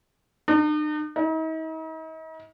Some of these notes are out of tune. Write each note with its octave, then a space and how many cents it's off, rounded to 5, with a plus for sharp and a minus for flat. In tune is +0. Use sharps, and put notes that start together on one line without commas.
D#4 -45
D#4 +45